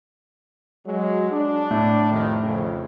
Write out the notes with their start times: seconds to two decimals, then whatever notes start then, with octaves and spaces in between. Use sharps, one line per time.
0.86 F#3 G#3
1.30 D4
1.71 A2
2.11 C2 F2 D#3
2.43 F2 C#3